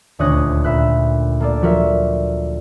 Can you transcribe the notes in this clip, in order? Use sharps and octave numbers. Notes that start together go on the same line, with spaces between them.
D#1 D2 C#5 D#6 F#6 A#6
A#2 E5 B5 F#6
A#3 A4 D5
F3 F#3 F#4 A#4 E5